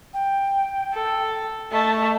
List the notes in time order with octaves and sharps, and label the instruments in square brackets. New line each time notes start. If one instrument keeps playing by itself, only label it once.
[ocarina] G5
[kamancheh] A4
[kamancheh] A3 A5 [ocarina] D#5